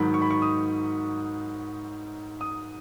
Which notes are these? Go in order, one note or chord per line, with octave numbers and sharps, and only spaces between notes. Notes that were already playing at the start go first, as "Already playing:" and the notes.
Already playing: G#2 D#3 F#3 B5
C#6
B5
C#6
D#6
D#6